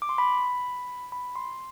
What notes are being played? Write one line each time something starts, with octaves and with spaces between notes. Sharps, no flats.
D6
C6
B5
B5
C6